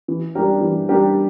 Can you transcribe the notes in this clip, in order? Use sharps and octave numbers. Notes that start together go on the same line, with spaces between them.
E3
G3 D4 G4 A#4
E3
G3 D4 G4 A#4